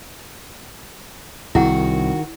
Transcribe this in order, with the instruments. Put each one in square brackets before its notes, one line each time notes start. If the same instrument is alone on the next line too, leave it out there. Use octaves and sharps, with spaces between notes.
[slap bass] C2 [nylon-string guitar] D#3 [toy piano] E4 G#4 F#5 [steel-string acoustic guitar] F#4